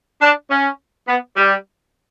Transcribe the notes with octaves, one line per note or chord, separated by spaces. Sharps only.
D4
C#4
B3
G3